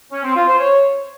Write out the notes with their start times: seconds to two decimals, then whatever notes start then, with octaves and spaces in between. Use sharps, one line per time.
0.12 C#4
0.24 C4
0.35 F4
0.47 C5
0.58 C#5